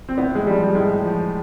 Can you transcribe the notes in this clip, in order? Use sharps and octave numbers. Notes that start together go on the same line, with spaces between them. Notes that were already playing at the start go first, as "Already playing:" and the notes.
C4
A2 B3
G#3
F3 G3
G3
A2 G#3
F3